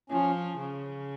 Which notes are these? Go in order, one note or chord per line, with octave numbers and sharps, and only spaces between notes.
F3 C#4
C#3